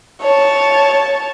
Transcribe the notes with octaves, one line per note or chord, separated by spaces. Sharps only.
C#5 A5